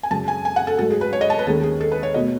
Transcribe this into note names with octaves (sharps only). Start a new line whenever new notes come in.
G#5
F#2 C#3 G#3 A5
G#5
G#5
F#5
A4
G#2 F#3 A3 A4
G#4
B4
C#5
D#5
A5
B4
D#2 D#3 G#3 C#4 A4
G#4
A4
B4
C#5
B2 A3 D#5